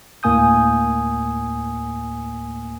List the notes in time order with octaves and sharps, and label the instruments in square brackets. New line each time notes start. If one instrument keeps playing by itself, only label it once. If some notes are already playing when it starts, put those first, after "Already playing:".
[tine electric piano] D2 A2 A#3 G#5 D#6 G6